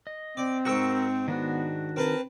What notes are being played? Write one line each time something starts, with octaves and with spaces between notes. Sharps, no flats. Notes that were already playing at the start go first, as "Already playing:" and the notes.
D#5
C4 D5
G#2 F#4 A#4 G5 C#6 E6
D#3 B3 D4 F#4
C4 A#4 B4 A5